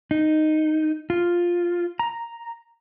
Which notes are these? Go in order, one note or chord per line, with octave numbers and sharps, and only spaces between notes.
D#4
F4
A#5